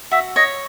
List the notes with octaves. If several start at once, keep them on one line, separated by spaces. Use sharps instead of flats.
F#4 E5
C#5 D#5